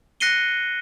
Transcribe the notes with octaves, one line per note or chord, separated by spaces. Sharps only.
F#6 A#6 C7 C#7 D#7 G7